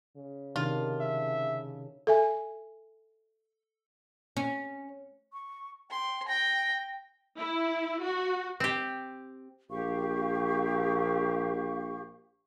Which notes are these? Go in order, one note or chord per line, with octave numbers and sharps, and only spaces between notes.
C#3
C3 D#3 D4 F4
E5
A4 E5 G#5
C#4
C#6
G5 C6
G5 A#6
E4
F#4
C4 G4
A#1 G4 F5 C#6